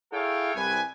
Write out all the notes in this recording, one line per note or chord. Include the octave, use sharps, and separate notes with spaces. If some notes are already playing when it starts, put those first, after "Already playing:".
E4 G#4 A4 C#5 F5 G5
C2 B4 G#5